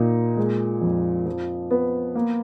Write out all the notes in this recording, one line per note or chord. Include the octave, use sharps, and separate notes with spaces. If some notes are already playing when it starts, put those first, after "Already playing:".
Already playing: A#2 D#4
G#3
F2
F3
B3
A#3